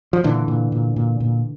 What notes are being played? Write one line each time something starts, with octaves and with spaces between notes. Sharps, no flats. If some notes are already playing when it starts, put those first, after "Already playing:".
F3
A#2 D3 E3
A#2
A#2
A#2
A#2